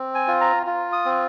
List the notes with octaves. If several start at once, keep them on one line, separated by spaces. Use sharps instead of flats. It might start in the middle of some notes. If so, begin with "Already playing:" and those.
Already playing: C4
G#5
F4
A#5
F4
D#6
C4